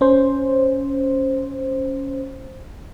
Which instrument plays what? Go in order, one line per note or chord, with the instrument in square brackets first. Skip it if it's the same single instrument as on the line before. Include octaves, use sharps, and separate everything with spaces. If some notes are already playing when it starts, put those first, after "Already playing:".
[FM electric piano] C#4 C5